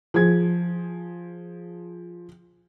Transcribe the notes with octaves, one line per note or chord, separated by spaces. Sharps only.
F3 G#4 G#6